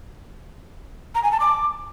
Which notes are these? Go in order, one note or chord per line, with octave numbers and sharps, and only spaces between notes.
A#5
G#5
A5
D6